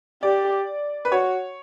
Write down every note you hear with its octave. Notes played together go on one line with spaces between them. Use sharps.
G4 D5
B4
F#4 C#5